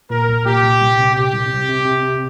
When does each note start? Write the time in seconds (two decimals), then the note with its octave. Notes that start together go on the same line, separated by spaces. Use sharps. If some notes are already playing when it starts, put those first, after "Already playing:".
0.10 A#2 A#4
0.27 C2
0.45 A#2 G4
0.63 C2
0.80 C2
0.98 C3
1.15 C3 G4
1.33 C2
1.50 C3
1.69 C3
1.85 C3
2.04 C3